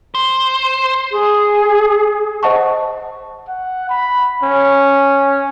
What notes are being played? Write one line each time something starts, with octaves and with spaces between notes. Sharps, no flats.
C5
G#4
C5 D#5 F#5 A5 C#6
F#5
B5
C#4